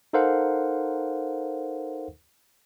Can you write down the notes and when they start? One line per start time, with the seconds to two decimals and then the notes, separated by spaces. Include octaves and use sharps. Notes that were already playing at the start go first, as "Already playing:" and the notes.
0.13 D#4 A4 A#4 C5 F5 F#5